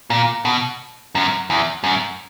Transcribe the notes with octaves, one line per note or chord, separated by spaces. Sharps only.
A#2
B2
F#2
E2
F#2